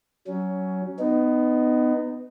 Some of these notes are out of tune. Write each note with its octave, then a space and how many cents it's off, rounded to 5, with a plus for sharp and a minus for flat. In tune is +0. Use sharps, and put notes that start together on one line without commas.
F#3 +20 C#4 +10
B3 +20 D#4 -15